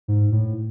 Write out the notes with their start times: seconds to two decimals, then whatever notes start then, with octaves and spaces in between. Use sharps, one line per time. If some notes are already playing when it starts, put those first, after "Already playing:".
0.08 G#2
0.32 A2